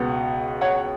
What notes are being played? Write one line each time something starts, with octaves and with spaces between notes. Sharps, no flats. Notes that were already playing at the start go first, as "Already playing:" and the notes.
Already playing: C#2 B2 B3
C#5 F#5